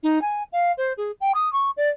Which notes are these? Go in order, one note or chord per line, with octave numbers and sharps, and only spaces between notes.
D#4
G#5
F5
C5
G#4
G5
D#6
C#6
D5